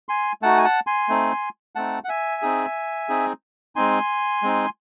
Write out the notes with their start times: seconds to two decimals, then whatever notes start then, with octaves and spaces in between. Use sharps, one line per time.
0.09 G#5 C6
0.42 A3 D#4 F#4 F#5 A5
0.58 G#5
0.64 F#5 A5
0.87 G#5 C6
1.09 A3 C4 D#4
1.75 A3 C4 D#4 F#5 A5
2.04 F#5
2.09 E5 G#5
2.42 C4 D#4 G#4
3.09 C4 D#4 G#4
3.76 G#3 C4 D#4 G#5 C6
4.43 G#3 C4 D#4